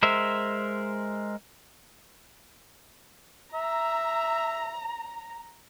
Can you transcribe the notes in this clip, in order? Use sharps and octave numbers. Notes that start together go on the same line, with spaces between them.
G#3 A#4 C5 E5
E5 A#5